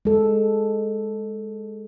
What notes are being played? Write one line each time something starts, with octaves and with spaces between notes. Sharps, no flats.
G#3 A4